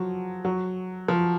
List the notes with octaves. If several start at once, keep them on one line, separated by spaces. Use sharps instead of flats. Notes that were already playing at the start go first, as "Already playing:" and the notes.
Already playing: F3 F#3
F#3
F3